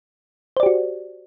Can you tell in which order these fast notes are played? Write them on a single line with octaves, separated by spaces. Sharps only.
C5 D5 G4 F#4